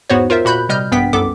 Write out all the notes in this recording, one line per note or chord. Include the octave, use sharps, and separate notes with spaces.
E2 G#2 B3 F#4 C5 C#5
F4 A#4 C5 E5
A#2 F#4 B5 F#6 G6
C3 G3 D#5 F6 G6
A#1 G2 B3 G5 B6
C2 F#2 B3 A4 D6